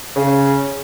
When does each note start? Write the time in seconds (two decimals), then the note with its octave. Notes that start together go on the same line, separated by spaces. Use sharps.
0.17 C#3